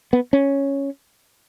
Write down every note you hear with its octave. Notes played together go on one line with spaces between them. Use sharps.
B3
C#4